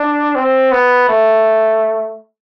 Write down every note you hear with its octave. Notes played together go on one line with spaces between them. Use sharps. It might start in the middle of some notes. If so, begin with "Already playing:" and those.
Already playing: D4
C4
B3
A3